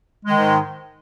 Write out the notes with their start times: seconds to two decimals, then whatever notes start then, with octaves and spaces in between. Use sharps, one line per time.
0.25 G#3
0.30 D#3
0.35 G#2